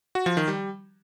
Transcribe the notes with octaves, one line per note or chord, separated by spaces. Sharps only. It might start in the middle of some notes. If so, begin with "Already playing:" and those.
F#4
F3
D#3
G3